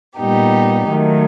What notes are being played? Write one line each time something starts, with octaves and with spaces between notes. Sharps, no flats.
A#2 G3 B3 D#4 G4
D#3 F#3 A3